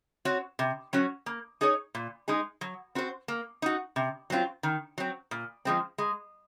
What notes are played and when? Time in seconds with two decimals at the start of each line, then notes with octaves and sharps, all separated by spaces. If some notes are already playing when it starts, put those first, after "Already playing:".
0.25 C4 F#4 C#5
0.59 C3
0.93 F#3 C#4 F#4
1.26 A#3
1.61 D#4 G#4 C#5
1.95 A#2
2.28 G#3 D#4 G#4
2.61 F#3
2.95 C4 F#4 C5
3.28 A#3
3.62 D#4 F#4
3.96 C3
4.30 F#3 C4 F4
4.63 D#3
4.98 F#3 C4
5.31 A#2
5.65 F3 G#3 C4
5.98 G#3